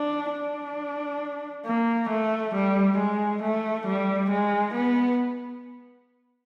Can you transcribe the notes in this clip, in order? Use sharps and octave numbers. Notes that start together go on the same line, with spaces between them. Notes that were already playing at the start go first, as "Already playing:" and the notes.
Already playing: D4
D4
A#3
A3
G3
G#3
A3
G3
G#3
B3